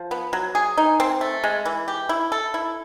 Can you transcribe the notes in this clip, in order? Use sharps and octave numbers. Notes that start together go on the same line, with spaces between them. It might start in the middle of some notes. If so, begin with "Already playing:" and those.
Already playing: F3
B3
F#3
G#4
D#4
C4
A3
G#3
E3
G4
E4
A4
E4